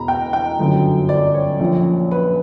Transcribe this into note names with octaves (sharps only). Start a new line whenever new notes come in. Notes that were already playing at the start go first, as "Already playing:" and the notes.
Already playing: E1 E2 B2 A#5 B5
G5
G5
G1 F#2 D3 F#3
D5
C#5
A#1 A#2 A#3 C#4
B4